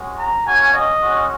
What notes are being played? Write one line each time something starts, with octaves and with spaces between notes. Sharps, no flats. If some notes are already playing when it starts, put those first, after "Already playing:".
Already playing: G#3 C#4 F#4
A#5
A#3 C#4 F#4 G#5
D#5
G#3 C#4 F#4